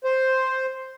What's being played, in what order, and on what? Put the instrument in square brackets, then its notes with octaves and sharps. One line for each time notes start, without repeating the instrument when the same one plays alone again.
[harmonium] C5